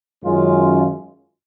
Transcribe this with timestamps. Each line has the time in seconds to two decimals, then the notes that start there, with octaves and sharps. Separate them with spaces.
0.22 F#2 D#3 G#3 C#4 F4